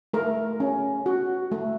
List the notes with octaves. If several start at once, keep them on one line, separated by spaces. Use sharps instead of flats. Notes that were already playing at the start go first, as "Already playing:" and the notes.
A3 A#4
C#4
F#4
A3